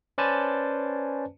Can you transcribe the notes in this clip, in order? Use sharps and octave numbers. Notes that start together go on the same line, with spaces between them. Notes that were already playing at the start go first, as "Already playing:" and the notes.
C#4 B4 C5 D5 G#5 A5